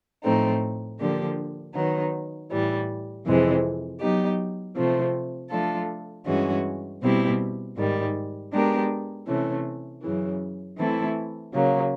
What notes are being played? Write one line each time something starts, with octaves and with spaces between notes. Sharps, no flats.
A2 F3 A3 C4 D#4
D3 F3 A#3 D4 G4
D#3 F#3 B3 D#4
A2 E3 G3
F2 C3 E3 G#3 C4
F#3 B3 D#4 G4
C3 F3 A3 C4
F3 A3 D4 F4 A4
G2 E3 G#3 C#4 F#4
B2 G3 C4 E4 G4
G#2 D#3 G3
G#3 B3 D4 G4 A#4
C3 E3 A3 C#4
F#2 C#3 E3
E3 A3 C4 E4 A4
C#3 F#3 A#3